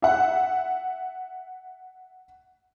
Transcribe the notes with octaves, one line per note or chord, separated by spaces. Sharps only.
E5 F#5